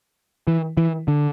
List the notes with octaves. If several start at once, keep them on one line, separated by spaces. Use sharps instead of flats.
E3
E3
D3